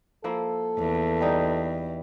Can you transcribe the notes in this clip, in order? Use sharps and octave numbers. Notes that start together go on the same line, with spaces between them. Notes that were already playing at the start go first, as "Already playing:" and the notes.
F3 A#3 E4 A4
E2
G3 D#4